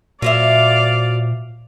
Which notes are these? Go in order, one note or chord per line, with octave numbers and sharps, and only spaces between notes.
A#2 F#3 C5 D5 E5 F5